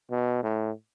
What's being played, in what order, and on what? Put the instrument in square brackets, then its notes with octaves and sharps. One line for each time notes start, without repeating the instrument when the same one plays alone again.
[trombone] B2
A2